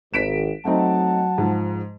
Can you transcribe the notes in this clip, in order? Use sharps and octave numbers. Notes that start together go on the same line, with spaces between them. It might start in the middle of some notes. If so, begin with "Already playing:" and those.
G#1 B6 D7 E7
F#3 A3 C4 D#4 F#5 A5
G#2 F3